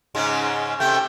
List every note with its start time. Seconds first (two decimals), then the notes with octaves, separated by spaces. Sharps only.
0.15 G#2 C#3 G#3
0.80 C3 A3 G5